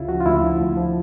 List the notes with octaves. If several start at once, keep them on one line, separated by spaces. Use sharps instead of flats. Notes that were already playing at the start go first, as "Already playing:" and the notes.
Already playing: D2 C#3 E4 F4
F3 F#4
F4
D2 E4
F3
D2
F3